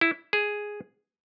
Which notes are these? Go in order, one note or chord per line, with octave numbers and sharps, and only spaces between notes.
E4
G#4